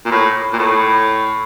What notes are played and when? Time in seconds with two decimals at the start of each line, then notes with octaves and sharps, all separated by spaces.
0.05 A#2
0.11 A2
0.53 A#2
0.59 A2